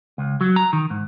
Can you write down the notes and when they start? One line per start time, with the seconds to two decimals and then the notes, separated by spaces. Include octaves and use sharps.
0.18 C#2
0.41 F#3
0.56 A#5
0.73 D#3
0.90 G#2